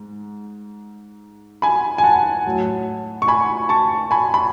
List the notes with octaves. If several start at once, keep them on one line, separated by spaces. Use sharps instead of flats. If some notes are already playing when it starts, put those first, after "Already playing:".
Already playing: G#2
G#5 B5
G#5
F#5 A5
A2 F#3
C#6
G#5 B5
A5 C#6
G#5 B5
B5